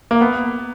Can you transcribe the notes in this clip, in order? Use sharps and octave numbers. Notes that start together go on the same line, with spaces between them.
A#3
B3